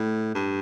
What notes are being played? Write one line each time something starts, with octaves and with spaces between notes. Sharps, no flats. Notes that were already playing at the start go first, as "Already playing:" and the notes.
Already playing: A2
G2